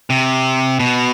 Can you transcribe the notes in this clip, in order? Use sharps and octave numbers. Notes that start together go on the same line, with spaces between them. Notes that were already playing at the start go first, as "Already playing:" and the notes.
C3
B2